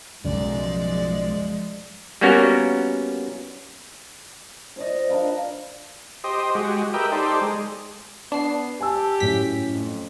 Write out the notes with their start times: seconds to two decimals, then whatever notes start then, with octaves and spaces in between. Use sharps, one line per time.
0.24 B1 F#2 C#3 F3 G#3 D5
2.21 G3 A#3 B3 C#4 F#4 A#4
4.76 C5 D5 D#5
5.09 D4 A#4 B4 F5
6.24 G4 C5 D#5
6.55 G#3 F#4 G4
6.94 G4 A#4 B4 D#5 E5 G5
7.12 D#4 G4 A4 C5 D5
7.41 G#3
8.32 B3 D4 C7
8.81 G4 G#5 A5 E6
9.20 F#2 A2 C#4 B6
9.72 F2